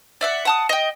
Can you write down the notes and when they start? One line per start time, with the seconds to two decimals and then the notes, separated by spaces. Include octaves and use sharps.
0.21 D5 E5 F#5
0.45 F#5 A5 D#6
0.69 D#5 G5